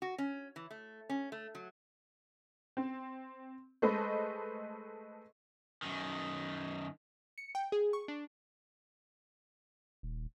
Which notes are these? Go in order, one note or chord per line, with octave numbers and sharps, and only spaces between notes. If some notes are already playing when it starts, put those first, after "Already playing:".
F#4
C#4
E3
A3
C#4
A3
F#3
C4
G#3 A3 A4 B4 C5 D#5
F#2 D#3
C#7
G5
G#4
C#6
D4
D#1